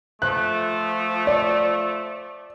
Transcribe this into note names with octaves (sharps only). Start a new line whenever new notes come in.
F3 A3 F#6
D5